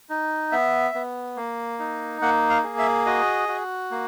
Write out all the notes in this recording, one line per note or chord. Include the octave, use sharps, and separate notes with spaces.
D#4
B3 E5
B3
A#3
D#4
A#3 F#5
F5
G#4
E5
F#4 D#5
F#4
A#3